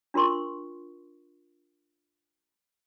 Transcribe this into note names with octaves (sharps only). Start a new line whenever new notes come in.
D4 F4 A#4 C6 C#6